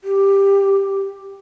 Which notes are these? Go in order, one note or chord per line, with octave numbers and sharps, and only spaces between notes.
G4